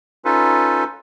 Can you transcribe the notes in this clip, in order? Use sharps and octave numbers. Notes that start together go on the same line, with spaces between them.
C#4 D#4 F4 A4 B4